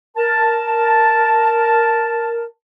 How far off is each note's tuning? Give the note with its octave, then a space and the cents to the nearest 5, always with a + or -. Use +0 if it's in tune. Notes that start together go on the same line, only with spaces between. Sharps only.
A#4 +0 A5 +0